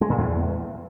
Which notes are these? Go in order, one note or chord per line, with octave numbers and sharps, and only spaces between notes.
G#3
A#2
E2